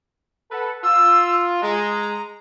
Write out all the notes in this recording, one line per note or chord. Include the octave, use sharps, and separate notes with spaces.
A4 B4 F#5
F4 E6
G#3 A#5